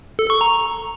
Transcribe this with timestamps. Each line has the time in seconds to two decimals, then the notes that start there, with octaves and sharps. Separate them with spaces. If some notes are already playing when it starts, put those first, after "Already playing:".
0.19 A4
0.30 C#6
0.41 A#5